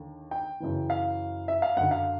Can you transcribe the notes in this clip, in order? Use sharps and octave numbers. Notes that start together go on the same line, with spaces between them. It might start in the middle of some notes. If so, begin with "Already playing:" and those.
Already playing: D#2 D3
G5
F#2 C#3 E3
F5
E5
F5
F#2 D3 F#5
F5